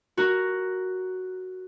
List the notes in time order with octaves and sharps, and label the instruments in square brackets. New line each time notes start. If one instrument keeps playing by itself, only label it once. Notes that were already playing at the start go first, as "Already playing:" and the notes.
[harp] F#4 A#4